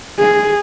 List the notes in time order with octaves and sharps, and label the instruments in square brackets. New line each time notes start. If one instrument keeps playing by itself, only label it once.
[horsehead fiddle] G#4